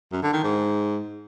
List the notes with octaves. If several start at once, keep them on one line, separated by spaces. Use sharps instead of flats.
F#2
D3
D#3
G#2